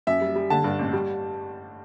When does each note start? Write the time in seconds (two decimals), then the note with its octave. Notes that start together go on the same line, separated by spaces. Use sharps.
0.07 F#2 E5
0.21 G3
0.36 G3
0.50 D3 A5
0.64 G2
0.79 A1
0.93 G3